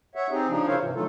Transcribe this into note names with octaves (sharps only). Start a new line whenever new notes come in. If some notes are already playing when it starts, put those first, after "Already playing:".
C#5 E5 F#5
C4 D#4 G4 G#4
C#3 F3 D4 D#4
E4 F4 A#4 C5 C#5 F5
G#2 C3 E3
D3 F#3 A3 D#4 F4 A4